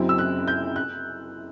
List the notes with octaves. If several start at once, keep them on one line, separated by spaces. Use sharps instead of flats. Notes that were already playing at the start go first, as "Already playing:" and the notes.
Already playing: F#1 F#2 F#3 C4 E4
E6
F#6
G6
F#6